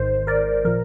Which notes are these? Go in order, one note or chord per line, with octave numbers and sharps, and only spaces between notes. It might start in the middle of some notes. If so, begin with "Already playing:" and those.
Already playing: G#1 G#2 D#3 C5
A#4 D5
A#2 F3 A#4